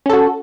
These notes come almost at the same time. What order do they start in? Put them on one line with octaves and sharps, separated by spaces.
C#4 A4 F#4